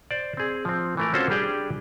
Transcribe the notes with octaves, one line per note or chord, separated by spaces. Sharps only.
C5 D5
C4 G#4
F3 C4
E3 A3 A#4
C4 C#4 F4 F#4 A4 C5
G3 D4 G4 G#4 G5